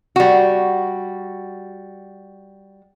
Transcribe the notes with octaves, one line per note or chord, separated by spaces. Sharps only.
G3 F#4